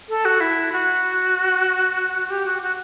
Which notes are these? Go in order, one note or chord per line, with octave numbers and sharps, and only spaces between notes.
A4
F#4
E4
F#4
G4
F#4
F#4